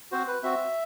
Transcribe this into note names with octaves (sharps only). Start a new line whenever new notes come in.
C4 F#4 C5
B4
C4 F#4 E5